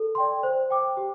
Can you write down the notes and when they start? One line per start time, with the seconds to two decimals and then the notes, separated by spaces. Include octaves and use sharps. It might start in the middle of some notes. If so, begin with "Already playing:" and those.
Already playing: A4
0.15 D5 G5 C6
0.43 C5
0.70 G5 D6
0.97 G4